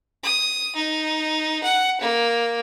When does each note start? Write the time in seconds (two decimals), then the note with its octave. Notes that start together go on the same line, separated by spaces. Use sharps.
0.23 D#6
0.75 D#4
1.63 F#5
2.00 A#3